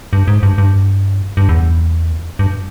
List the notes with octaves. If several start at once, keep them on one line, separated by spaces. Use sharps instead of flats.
G2
G#2
G2
G2
G2
E2
G2